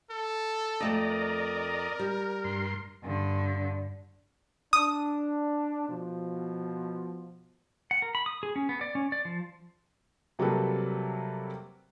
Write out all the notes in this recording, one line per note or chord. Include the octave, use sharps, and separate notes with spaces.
A4
F2 A3 D5 D#5 A#5
A#4
G3
G2 C6
G2 D3
D4 D#6
B2 F3
F#5
A#4
B5
D#6
G#4
C#4
B3
D5
C#4
D5
F3
C3 F#3 G3 A#3 A4 B4